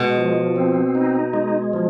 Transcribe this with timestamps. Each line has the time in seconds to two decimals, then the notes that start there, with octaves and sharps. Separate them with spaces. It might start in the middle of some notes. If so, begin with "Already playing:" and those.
Already playing: B2 G#3
0.18 F3
0.56 C4
0.95 D#4
1.34 G#3
1.73 F3